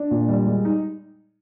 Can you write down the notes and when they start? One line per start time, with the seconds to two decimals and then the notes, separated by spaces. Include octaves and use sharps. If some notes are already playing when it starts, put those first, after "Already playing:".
Already playing: D4
0.11 A#2
0.29 G3
0.47 G#3
0.65 D#4